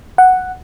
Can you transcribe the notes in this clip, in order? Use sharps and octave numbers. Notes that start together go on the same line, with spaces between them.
F#5